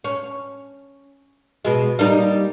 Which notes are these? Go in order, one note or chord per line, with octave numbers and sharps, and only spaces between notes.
C#4
B2 G#3
G3 A#3 D#4